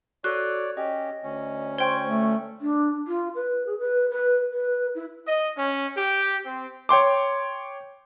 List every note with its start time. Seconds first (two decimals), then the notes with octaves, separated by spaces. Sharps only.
0.24 F#4 A4 C#5 D5 F#6
0.77 C#4 G4 D#5
1.23 D2 C#4
1.78 C5 G5 C#6 G#6 G7
2.05 A3
2.60 D4
3.07 F4
3.35 B4
3.66 G#4
3.79 B4
4.09 B4
4.52 B4
4.94 E4
5.26 D#5
5.57 C#4
5.97 G4
6.46 C4
6.89 C#5 G5 C6 D6